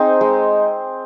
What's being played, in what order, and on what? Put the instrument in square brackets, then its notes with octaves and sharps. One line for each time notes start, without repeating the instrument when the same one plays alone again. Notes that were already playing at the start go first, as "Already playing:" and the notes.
Already playing: [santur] C4 D#4 G#4
G#3